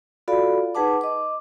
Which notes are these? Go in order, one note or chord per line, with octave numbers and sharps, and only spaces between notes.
F4 F#4 A4 D5 F5 B5
D#4 G#4 B4 F#5 A5 D6
D#5 D6